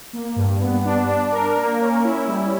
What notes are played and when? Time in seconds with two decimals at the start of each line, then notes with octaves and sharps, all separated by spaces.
0.13 A#3
0.36 G2
0.60 B3
0.85 D4
1.09 D4
1.32 A#4
1.57 A#3
1.80 C#4
2.05 E4
2.27 G3